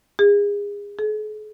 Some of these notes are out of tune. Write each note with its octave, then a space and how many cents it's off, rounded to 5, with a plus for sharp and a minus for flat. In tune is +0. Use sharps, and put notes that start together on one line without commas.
G#4 -30
G#4 +45